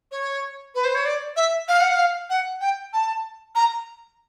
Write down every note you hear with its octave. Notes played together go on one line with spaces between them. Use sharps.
C#5
B4
C5
C#5
D5
E5
F5
F#5
F5
F#5
G5
A5
A#5